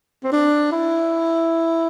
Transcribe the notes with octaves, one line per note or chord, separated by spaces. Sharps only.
C4
D4
E4